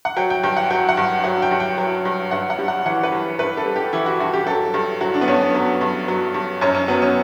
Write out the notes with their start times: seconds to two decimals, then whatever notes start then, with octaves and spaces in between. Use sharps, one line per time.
0.05 F#5
0.17 F#3 G5
0.30 G5
0.43 G2 G5
0.57 F#5
0.70 F#3 G5
0.89 F#5
0.97 G2
1.24 F#3 F#5
1.42 G5
1.51 G2
1.60 G5
1.78 F#3
2.05 G2
2.31 G2 F#5
2.50 F#5
2.59 G3
2.68 F#5
2.85 E3 F#5
3.03 B4
3.12 G2
3.39 G2 B4
3.57 A4
3.66 G3
3.76 G4
3.93 E3 E4
4.06 F#4
4.20 G2 F#4
4.33 G4
4.47 F#3 A4
4.74 G2
5.01 F#3 F#4
5.14 D4
5.21 B3
5.28 G2 C#4
5.41 B3
5.54 F#3
5.81 G2
6.08 F#3
6.34 G2
6.61 F#2 C#4
6.75 C#4
6.88 F#3 B3
7.02 C#4